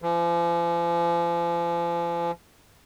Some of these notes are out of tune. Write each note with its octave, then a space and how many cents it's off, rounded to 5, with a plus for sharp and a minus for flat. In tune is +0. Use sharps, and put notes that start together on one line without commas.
F3 -40